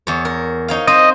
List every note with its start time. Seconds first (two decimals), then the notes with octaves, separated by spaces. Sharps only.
0.07 E2 C#5
0.25 A#4
0.68 D#4 C#5 F5
0.87 C4 D#4 C5 D#5